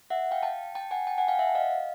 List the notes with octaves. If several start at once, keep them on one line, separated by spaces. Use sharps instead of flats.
E5 F#5
F5 G5
G5 A5
G5 A5
F#5 G#5
G5 A5
F#5 G#5
F5 G5
E5 F#5
D#5 F5